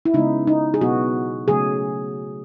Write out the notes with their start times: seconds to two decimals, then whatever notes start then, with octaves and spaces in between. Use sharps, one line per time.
0.06 E4
0.14 C#3 G#3 B3 D#4
0.47 D#4
0.74 G#4
0.81 B2 F#3 B3 F#4
1.48 C#3 F#3 A3 G#4